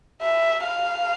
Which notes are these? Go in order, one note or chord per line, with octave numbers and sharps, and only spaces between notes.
E5
F5